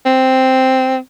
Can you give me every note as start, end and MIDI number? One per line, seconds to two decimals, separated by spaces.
0.06 0.98 60